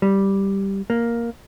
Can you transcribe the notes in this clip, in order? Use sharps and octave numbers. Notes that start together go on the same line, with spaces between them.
G3
A#3